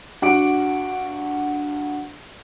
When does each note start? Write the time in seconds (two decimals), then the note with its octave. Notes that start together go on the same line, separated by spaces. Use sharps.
0.22 G2 F#4 F#5 D6 D7